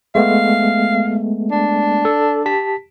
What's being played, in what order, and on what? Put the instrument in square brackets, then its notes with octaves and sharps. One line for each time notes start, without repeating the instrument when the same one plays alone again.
[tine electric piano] G#3 A3 B3 [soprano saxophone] F5
[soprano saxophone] D4
[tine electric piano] A4
G4 A5 B6